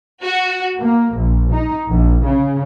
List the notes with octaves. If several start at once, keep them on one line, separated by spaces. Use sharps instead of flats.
F#4
A#3
A#1
D#4
A#1
C#3